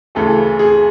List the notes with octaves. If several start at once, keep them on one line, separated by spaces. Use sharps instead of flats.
D2 C#3 E3 A4
G#4